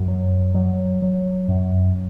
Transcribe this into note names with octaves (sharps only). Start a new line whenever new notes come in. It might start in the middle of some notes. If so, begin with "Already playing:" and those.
Already playing: F#2
F#3
F#3
F#3
F#2